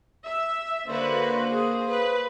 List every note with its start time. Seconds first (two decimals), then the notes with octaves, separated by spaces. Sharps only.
0.24 E5
0.87 D3 A#3 F#4 B4 C5
1.51 G#4
1.89 B4